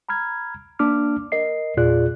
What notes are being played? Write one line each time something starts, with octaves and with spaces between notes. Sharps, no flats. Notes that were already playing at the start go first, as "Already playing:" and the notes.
A#5 B5 F6 G#6
A#3 D4 D6 F6
A#4 D#5 C7
E2 A#2 F4 G#4 D5 F#6